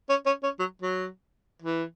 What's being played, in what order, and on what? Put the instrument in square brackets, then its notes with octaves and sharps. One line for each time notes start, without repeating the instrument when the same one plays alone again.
[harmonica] C#4
C#4
C#4
F#3
F#3
E3